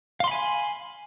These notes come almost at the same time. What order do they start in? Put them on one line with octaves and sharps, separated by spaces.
F5 C6 B5 G#5